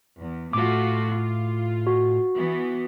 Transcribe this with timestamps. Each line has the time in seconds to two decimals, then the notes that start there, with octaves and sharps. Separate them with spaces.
0.19 E2
0.53 A2 A3 F4 F#4 D6
1.08 F4
1.87 F#4
2.35 E3 B3